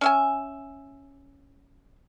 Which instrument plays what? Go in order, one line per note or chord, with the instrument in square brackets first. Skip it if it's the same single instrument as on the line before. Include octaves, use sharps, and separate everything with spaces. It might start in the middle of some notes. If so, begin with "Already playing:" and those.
[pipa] C#4 E5 G#5